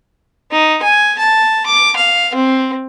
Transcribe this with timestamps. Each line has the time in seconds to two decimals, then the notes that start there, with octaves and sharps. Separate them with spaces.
0.52 D#4
0.83 G#5
1.19 A5
1.66 D6
1.97 F5
2.35 C4